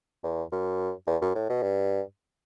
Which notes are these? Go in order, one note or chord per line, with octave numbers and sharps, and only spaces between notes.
E2
F#2
E2
F#2
A2
B2
G2